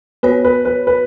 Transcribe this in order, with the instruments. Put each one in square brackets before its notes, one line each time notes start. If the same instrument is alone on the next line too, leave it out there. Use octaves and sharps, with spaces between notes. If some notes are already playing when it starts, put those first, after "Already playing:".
[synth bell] B3 F#4 C#5 [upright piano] B4
[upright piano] B4
B4
B4